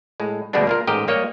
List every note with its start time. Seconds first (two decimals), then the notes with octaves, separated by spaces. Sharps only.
0.20 A2 G#3
0.53 D2 B2 G3 G#3 B3 D4
0.67 A#3 F4 A#4
0.87 A1 G#2 G4 A#4 D#5 G5
1.08 G3 A#3 C#5 D#5